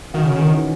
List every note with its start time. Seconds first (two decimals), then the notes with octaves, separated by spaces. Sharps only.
0.14 D#3 F#4
0.24 C#3 C#4
0.35 D#3 E3
0.48 D#3